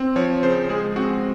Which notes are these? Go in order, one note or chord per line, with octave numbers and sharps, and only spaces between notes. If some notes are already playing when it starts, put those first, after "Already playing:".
Already playing: C4
F3 C#5
C#3 C5
G#3 G#4
C4 F#4